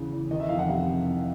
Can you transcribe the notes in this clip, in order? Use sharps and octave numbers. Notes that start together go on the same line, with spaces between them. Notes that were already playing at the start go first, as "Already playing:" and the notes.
Already playing: E2 C#3
E2
D#3 D#5
E5
F2 F5
F#5
C3 F5